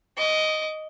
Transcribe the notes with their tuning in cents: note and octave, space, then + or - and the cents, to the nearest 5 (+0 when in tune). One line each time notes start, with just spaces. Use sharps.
D#5 +0 D6 -35